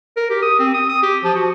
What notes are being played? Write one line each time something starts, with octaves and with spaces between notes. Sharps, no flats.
A#4
G4
D#6
C4
D#6
D#6
G4
F3
F#4